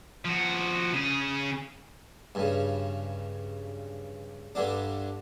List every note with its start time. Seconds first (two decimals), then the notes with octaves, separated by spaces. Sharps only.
0.25 F3 F#4
0.93 C#3 G#4
2.35 G2 C#3
4.55 G2 D3 D4